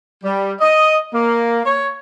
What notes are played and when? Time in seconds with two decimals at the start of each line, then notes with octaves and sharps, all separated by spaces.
0.24 G3
0.61 D#5
1.14 A#3
1.65 C#5